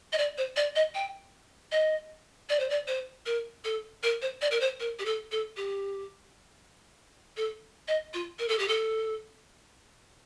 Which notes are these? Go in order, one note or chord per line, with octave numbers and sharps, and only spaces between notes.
D#5
D5
C5
D5
D#5
G5
D#5
D5
C5
D5
C5
A#4
A4
A#4
C5
D5
A#4
C5
A#4
G4
A4
A4
G4
A4
D#5
F4
A#4
A4
G4
A4